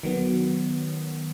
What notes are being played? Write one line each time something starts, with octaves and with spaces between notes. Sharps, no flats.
D#3 F#3 B3